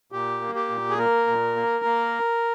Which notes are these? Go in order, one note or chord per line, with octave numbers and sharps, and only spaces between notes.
A#2 G4
A#3
G4
A#2
G#4
A#3 A#4
A#2
A#3
A#3